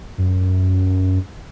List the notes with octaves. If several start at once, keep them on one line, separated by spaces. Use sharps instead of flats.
F#2